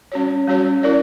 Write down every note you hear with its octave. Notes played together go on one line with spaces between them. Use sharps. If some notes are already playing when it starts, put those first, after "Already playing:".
G3 C#4 F#4 C#5
G3 C#4 F#4 C#5
C#4 E4 A#4 D5